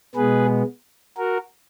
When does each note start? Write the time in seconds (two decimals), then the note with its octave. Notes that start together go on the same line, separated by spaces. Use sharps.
0.15 B2 G#3 B3 G#4 B4
1.17 F#4 A#4